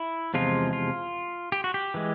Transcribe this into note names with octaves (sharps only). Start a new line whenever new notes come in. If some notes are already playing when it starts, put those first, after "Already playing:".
Already playing: E4
E2 C3 F3 G#3 F4
F4
G4
F#4
G4
E3 G#3